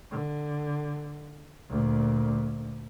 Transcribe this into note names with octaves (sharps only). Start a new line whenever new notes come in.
D3
D2 A#2